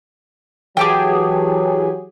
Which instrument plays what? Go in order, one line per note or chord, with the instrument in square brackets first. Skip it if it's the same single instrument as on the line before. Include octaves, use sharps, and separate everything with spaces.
[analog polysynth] E3 G4 G#4 [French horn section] F#3 [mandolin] G5 A5 D6